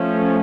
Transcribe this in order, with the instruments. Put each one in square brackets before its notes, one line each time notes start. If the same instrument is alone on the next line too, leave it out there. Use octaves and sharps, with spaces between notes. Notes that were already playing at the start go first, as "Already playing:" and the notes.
Already playing: [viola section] F3 A3 C#4